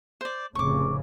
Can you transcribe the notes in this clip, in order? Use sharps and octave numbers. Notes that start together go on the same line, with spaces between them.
C5 D5
F1 A2 C#3 C#6 D6